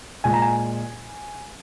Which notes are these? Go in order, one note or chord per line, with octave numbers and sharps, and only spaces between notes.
A#2 G#3 G#5
A#5
G#5